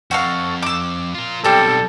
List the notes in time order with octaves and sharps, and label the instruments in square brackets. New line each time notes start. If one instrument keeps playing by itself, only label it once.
[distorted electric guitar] F2 [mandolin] F#4 A4 F5
[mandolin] D6 E6
[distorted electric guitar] F4 A#4
[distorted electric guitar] B1 [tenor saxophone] G3 [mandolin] C4 D4 [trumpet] A4